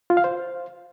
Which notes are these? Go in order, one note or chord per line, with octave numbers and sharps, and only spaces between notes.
F4
F5
C5